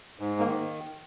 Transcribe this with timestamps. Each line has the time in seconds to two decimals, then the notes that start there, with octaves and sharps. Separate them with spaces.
0.20 G#2
0.39 A#3
0.46 D#3